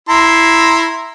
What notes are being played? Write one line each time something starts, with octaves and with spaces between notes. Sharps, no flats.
E4 A#5 C6